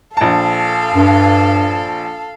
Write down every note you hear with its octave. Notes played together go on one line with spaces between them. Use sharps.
A#1 A4 F5 A5
G2